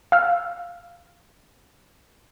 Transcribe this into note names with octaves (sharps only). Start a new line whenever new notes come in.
F5 E6 F6